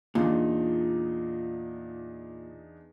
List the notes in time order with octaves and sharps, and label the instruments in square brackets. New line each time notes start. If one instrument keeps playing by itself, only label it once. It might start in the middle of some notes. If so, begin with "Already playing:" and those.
[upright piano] E2 D4 D#4 [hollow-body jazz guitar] A#2